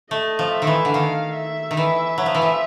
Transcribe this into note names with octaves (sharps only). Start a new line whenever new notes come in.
A3 D#5
F3
E5
D#3
E3
D3
D#3 F5
E5
D#3
E3
F#3
F3
E3
F3